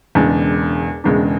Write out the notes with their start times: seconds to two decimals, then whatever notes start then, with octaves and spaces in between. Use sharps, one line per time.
0.15 E1 E2 C#3 G#3 D4
1.04 E1 E2 C#3 G#3 D4